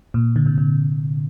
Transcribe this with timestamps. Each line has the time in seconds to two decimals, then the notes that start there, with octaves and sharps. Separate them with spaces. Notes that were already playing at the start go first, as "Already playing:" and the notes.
0.14 A#2
0.36 D3
0.46 C3
0.58 C3